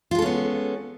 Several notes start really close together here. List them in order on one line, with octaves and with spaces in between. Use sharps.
F4 G#3 A4 C#4 B3